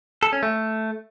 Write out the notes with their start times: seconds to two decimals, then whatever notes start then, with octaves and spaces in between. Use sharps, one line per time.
0.23 A4
0.33 C#4
0.43 A3